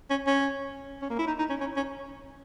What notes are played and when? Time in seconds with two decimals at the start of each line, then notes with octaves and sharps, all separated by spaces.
0.10 C#4
0.27 C#4
1.02 C#4
1.10 A#3
1.19 E4
1.27 D#4
1.38 D#4
1.50 C#4
1.60 C#4
1.77 C#4